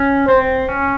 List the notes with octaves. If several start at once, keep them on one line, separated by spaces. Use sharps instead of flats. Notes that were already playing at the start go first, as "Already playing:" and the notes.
Already playing: C#4
C4 C5
C#4